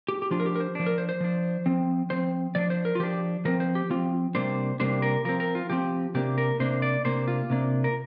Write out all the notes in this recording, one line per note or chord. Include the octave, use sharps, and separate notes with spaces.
G4
G4
F3 D4 F4
A#4
G4
A#4
C5
F3 D4
A#4
C5
C5
F3 D4
F3 C4
F3 C4 C5
F3 D4 D5
C5
A#4
F4
F3 D4 G4
F3 C4 A#4
C5
G4
F3 C4 F4
C3 G3 A#3 D4 C5
C3 G3 A#3 D4 C5
A#4
F3 C4 A#4
A#4
F4
F3 C4 G4
C3 A#3 D4 G4
A#4
C3 A#3 D4 C5
D5
C3 A#3 D4 C5
F4
C3 A#3 D4
A#4